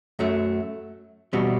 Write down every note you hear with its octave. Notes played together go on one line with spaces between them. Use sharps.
F#2 F#3 A3
E2 B2 G3 C4 F#4